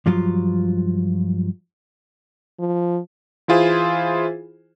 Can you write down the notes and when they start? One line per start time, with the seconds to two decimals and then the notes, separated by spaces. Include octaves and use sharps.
0.06 G2 F3 F#3 F4
2.59 F3
3.48 E3 E4 F4 G#4 C5